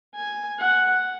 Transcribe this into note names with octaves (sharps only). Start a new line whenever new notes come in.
G#5
F#5